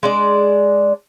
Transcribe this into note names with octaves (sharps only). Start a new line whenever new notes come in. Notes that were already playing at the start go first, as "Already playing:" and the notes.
G#3 D4 D5